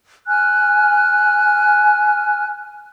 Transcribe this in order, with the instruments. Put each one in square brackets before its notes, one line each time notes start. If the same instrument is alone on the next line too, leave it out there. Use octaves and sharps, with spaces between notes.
[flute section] G#5 F6 F#6